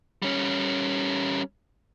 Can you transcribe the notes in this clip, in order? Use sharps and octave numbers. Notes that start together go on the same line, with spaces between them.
G3 C#4